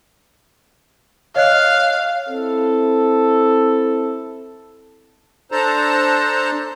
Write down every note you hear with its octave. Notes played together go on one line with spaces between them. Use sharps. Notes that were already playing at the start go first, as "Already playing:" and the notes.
C#5 D#5 F5 F#6
C4 E4 A4
D4 A4 C5 A5 A#5